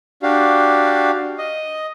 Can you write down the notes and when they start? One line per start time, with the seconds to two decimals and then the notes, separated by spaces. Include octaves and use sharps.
0.23 D4 F#4 G4 F5
1.38 D#5